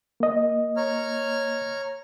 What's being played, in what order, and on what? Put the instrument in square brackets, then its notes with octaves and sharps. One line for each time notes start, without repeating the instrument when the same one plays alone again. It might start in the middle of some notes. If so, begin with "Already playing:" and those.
[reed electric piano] A#3 D#5
[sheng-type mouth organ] C#5 A#5 F6